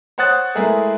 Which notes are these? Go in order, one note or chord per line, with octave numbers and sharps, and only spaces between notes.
C5 C#5 F#5 D#6 F#6 A6
G#3 A3 B3 E4 G#4 A#4